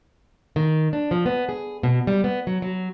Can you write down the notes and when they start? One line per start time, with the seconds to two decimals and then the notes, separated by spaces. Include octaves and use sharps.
0.56 D#3
0.93 D4
1.11 F3
1.26 B3
1.49 G#4
1.83 B2
2.07 G3
2.24 B3
2.47 F#3
2.62 F#3